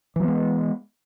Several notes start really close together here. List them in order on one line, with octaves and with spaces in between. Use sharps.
E3 F#3 B3 G#3